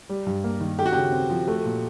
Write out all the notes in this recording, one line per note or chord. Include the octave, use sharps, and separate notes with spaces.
G3
G2
A#3
D#3
A3 G4
F#4
C#3 G4
C4
F3
A3
A#2